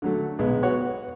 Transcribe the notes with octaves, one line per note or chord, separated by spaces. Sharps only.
D3 F#3 A3
B1 G#3 B3
F#4 B4 C#5 F#5